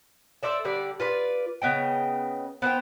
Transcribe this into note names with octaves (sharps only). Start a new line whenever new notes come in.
A4 C5 D5 E5
D3 G3 D5
F4 B4 D5
C#3 B3 D#5 G5
B3 C5 D#5 G5